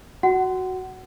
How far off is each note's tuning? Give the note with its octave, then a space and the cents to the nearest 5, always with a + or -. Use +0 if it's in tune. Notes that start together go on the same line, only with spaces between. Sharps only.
F#4 +0 F#5 +25